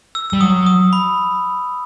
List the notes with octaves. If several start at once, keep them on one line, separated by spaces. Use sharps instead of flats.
E6
G3 E6
F#3 D#6
D#6
B5